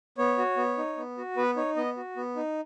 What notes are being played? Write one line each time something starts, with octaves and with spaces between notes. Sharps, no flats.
B3 C#5
F#4
B3
D#4
B3
F#4
B3 B4
D#4 C#5
B3 D#5
F#4
B3
D#4